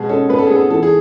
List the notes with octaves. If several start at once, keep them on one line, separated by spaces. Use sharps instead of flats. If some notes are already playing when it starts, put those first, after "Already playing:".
Already playing: B2 G#3 G#4
C#4 A4
B3 B4
A4
G#4
B3
A4
E3 A4
G#4